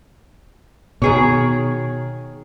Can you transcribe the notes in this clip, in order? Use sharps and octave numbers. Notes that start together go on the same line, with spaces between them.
B2 D#3 G#4 C#5